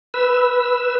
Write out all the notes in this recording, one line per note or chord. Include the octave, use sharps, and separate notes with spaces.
B4 E6